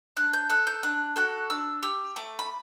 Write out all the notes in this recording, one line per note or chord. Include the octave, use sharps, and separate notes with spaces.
D4 F#6
G6
A4 F#6
G6
D4 F#6
F#4 A4 F#6
D4 E6
G4 E6
A3 D6
B5